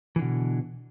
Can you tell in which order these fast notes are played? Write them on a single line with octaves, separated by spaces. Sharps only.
E3 D3 B2